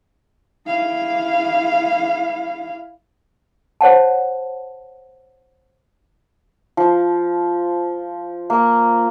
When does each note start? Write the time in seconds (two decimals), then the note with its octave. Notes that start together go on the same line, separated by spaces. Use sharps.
0.67 E4 F5
3.81 C5 C#5 F#5 A5
6.77 F3
8.50 A#3